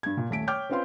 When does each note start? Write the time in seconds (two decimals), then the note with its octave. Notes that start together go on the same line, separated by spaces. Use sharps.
0.03 G2 G#6
0.17 A#2
0.30 D#1 A3 B6 D7
0.47 C#5 G5 D6 F6 G6
0.69 C4 C#4 F4 B4 F5 C6